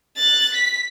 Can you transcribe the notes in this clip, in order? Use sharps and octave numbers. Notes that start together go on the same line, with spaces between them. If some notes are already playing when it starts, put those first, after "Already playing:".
F#6 A6
B6